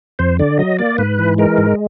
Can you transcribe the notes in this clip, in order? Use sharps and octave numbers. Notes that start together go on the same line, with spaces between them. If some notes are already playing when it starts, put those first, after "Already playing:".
F2 C5
D3 D5
F#3 D#5
A#3 D5
G#2 B4
E3
G#3 A#4
G#2